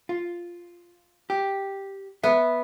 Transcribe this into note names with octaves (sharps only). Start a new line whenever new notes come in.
F4
G4
B3 E5